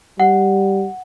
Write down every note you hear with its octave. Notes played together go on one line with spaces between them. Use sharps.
G3 F#5